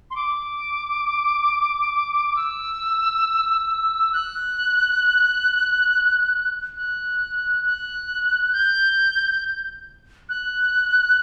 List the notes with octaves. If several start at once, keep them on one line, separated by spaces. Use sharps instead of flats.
C6
D6
E6
F#6
F#6
F#6
G6
F#6